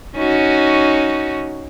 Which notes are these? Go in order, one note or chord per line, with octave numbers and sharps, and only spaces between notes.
C#4 D#4 F#4